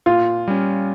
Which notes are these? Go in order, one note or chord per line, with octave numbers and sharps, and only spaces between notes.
A#2 F4
G3 C#4